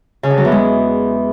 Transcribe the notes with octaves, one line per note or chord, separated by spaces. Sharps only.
C#3
D3
F#3
E2
G#3